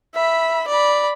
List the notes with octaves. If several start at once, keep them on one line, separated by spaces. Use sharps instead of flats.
E5 B5
D5 B5